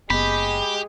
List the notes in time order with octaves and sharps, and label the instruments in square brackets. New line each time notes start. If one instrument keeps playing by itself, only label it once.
[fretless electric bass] F#1 B3 [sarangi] G#3 [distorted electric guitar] G4 [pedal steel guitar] B5